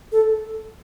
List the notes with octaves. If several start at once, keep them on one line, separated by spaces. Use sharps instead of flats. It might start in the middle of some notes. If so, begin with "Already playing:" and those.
A4